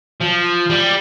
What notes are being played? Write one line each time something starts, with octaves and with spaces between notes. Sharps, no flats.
F3
G3